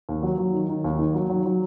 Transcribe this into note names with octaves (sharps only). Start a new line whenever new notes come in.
D#2
F#3
F#3
D#3
D#3
D#2
D#3
F#3
F#3
F#3